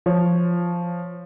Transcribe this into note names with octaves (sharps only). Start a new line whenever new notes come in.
F3 C#5